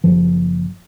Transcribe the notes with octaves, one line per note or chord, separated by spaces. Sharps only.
F#1 F3